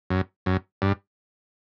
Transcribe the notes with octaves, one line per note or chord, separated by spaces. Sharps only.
F#2
F#2
G2